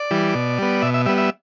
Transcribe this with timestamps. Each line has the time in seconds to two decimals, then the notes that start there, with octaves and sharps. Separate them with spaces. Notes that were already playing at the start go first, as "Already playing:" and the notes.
Already playing: D5
0.11 E3 G3
0.35 B2
0.59 G3 B3
0.82 B2 E5
0.94 E5
1.06 G3 B3 E5
1.18 E5